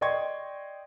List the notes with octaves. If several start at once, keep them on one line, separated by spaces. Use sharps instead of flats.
D5 D#5 G5 C6 C#6 G#6